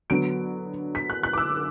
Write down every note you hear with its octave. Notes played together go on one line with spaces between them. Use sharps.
D3 F#3 B3 D7
B6
F#6
F#6
D6
E6